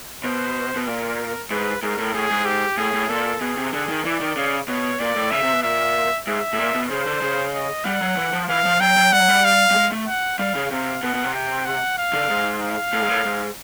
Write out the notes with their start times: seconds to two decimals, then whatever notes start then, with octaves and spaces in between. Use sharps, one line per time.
0.24 B2 C5
0.76 B2
0.87 A#2 A#4
1.51 G#2 B4
1.82 G#2 A#4
1.98 A2
2.14 A2 G#4
2.30 G#2
2.46 G4
2.77 A2 G#4
2.93 A2
3.09 A#2 A4
3.41 B2 G#4
3.57 C3
3.73 D3 G#4
3.89 D#3
4.05 E3 D5
4.20 D#3
4.36 C#3
4.68 B2 C#5
5.00 A#2 D5
5.16 A2
5.31 C#3 E5
5.42 C3
5.53 B2
5.63 A#2 E5
6.27 G#2 E5
6.53 A2
6.58 A#2
6.75 B2
6.90 C#3 C5
7.06 D3
7.22 C#3
7.54 D#5
7.85 G3 F#5
8.01 F#3
8.17 E3
8.33 F3
8.49 E3 F5
8.65 F3
8.80 F#3 G5
8.97 F#3
9.13 G3 F#5
9.20 F#3
9.28 G3
9.44 F5
9.71 G3
9.76 G#3
9.92 A3
10.08 F#5
10.39 G3 F5
10.55 C#3
10.71 C3 F5
11.03 B2 F#5
11.14 B2
11.24 C3
11.34 G5
11.66 F#5
11.98 F5
12.13 D3
12.30 G#2
12.62 F5
12.93 A2
13.02 G#2
13.09 A2
13.25 G#2